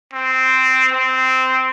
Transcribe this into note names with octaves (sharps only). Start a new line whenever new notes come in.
C4
C4